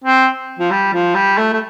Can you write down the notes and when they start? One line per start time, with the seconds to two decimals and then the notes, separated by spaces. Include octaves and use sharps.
0.04 C4
0.59 F3
0.71 G3
0.93 F3
1.15 G3
1.37 A3
1.53 A3